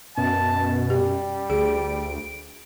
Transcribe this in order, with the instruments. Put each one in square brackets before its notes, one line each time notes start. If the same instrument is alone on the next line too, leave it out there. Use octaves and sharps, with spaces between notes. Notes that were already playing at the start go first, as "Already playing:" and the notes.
[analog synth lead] F#2 [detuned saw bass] B2 [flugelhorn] A5
[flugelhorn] G3 [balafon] G4
[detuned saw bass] D2 [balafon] G#4 [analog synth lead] D7